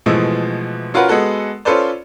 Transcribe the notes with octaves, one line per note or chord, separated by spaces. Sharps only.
B2 E3 F3 G#3 A3
C#4 F4 F#4 A#4 B4 F#5
G#3 B3 F#4 A4 F#5
C#4 F4 A4 B4 C5 D5